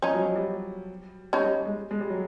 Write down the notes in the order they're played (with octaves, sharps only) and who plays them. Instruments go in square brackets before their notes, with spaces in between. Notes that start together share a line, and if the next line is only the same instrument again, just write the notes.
[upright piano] F3 [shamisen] C#4 D#4
[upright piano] F#3
F#3
G3
[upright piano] G3 [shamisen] C#4 D#4
[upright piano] G3
G#3
G#3
G3
F#3